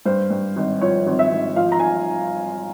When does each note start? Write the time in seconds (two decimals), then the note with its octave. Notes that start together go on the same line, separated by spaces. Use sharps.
0.06 G2 C5
0.30 G2
0.56 G#1
0.81 F3 C#5
1.07 G#1
1.19 E5
1.31 G#1
1.56 F3 F5
1.72 A#5
1.79 G#5